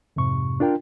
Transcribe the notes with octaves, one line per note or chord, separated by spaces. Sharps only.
F2 G#2 C3 C#6
D4 F4 A#4 G5